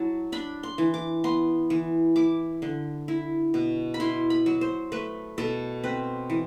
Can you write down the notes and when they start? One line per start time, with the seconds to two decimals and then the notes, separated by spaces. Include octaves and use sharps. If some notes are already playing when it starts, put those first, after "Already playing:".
Already playing: F#3 E4 A5
0.32 D4 B5
0.63 C6
0.78 E3
0.94 D6
1.24 B3 C6
1.70 E3
2.16 E4 D6
2.62 D3
3.08 E4
3.54 B2
3.94 B5
4.00 E4 C6
4.30 B5
4.46 F#3
4.61 C5
4.92 A3 B4
5.38 B2 A4
5.83 C4 B4
6.30 E3